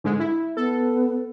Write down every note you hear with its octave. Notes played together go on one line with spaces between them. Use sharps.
G#2 D3 G#3
E4
B3 A4